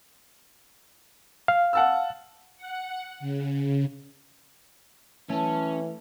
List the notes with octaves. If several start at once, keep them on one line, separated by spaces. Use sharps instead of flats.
F5
F#5 A5 E6
F#5
C#3
E3 A3 C#4